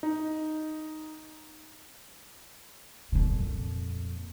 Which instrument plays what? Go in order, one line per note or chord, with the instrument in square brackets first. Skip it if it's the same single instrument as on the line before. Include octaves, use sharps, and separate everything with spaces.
[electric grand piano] D#4
[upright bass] F2 A#2